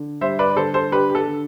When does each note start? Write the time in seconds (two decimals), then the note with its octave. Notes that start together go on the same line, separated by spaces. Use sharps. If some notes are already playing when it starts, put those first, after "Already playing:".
Already playing: D3
0.21 G3 C5 E5
0.39 B4 D5
0.51 D5
0.56 D3 A4 C5
0.74 A4 C5
0.92 D4 G4 B4
1.09 G4
1.15 A4
1.27 D3